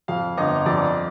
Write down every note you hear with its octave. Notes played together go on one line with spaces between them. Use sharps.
F2 F5
G1 D#5
F2 D5